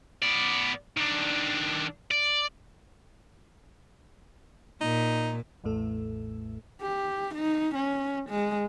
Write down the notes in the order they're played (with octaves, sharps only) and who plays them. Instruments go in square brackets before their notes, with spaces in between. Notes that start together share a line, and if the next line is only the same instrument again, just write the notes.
[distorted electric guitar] B3 D5
D#3 D4
D5
[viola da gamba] A#2 [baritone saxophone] D#4
[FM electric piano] A1 E2 A2 A3 A4
[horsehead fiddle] G4
D#4
C#4
G#3